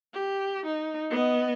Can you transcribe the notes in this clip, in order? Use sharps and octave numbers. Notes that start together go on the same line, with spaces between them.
G4
D#4
B3 D#5